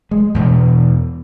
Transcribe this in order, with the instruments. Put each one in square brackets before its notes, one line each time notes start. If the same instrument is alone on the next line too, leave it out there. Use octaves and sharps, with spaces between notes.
[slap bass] G#3
E2 B2